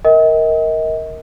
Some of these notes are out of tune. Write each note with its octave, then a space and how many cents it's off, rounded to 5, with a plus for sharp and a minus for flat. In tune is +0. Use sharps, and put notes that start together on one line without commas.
A#4 +0 D#5 +35 G5 +0